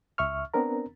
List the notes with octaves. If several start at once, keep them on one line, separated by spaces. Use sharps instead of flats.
C#2 E5 C#6 F6
B3 C4 D4 A#4 A#5